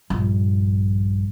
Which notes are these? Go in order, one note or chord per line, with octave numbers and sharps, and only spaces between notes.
A#1 G2